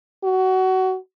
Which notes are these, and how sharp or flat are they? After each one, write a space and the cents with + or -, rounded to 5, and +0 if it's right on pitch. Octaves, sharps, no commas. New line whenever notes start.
F#4 +20